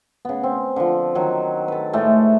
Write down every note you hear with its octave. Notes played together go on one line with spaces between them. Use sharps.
C#3 B3
C4
D3 F3
D#3 F#3
A4 B4
A2 G#3 A3